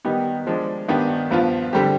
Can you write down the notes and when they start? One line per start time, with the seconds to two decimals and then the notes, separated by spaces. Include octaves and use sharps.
0.05 D#3 G3 B3 D#4 G4
0.47 F3 G#3 D4
0.88 G2 D#3 B3 D4 G4
1.31 G2 F3 B3 F4
1.73 D3 G3 C4 G4